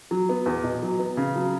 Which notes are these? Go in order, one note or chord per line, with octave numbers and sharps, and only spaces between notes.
F#3
B3
E2
B2
F#3
B3
C#3
F#3